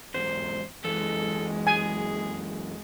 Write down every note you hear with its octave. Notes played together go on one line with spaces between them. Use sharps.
E2 G#2 C5
F#2 E3 G#3 A4
G#4 G#5